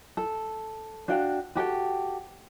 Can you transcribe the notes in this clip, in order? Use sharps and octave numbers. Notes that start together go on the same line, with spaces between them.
A4
D4 F#4 F5 G5
F#4 G4 A4 G5